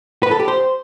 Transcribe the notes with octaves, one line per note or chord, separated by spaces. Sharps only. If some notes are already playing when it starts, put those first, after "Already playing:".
B4
A4
G4
C5